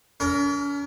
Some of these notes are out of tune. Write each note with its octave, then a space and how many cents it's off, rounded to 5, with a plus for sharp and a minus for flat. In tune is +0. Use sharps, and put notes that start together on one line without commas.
C#4 +45 A#4 +0